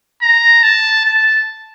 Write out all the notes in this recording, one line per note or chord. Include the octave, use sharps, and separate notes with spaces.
A#5
A5
A5